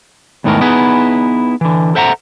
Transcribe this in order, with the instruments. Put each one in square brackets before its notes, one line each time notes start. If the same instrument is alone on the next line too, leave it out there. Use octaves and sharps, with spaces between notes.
[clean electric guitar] E2 G#2 D#3 E3 A3 A#4
B3 D#4 E4 G#4 B4
D3 E3
A4 C5 E5 F#5 G5 A#5